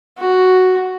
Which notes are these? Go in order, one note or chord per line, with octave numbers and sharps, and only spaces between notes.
F#4